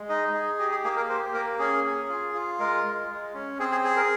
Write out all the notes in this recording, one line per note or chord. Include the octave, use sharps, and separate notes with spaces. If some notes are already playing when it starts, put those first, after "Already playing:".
Already playing: G#3
D#4 D#5
G#4
G4 D#5
G#4
A#3 G#4
A#4
G4 C5
A#3 A#4
C#4 G#4
G#4
F4
F4
G#3 A#4
G#3
G#3
C#4
C4 G#4
G#4
G#4
A#4